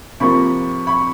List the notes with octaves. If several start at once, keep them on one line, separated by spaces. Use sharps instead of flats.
C3 F3 A#3 B5 C#6
B5 C#6